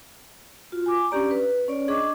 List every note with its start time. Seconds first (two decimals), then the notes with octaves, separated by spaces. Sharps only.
0.72 F4 F#4
0.86 G#5 D6
1.11 C#4 D4 G4 D5 A#5
1.31 B4
1.68 C#4 C#5 D5
1.88 D4 G#4 D#5 C#6 D6